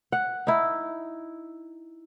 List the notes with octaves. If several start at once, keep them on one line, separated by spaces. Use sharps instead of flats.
F#5
D#4 E4